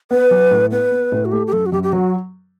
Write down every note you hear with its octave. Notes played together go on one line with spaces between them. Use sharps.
B3 B4
F#3
A2
B3 B4
B3
A2
F#4
A3 G4
G4
F#2 A4
F#4
F#2 G4
G4
F#3 F#4